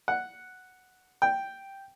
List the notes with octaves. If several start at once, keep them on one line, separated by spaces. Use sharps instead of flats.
F#5
G5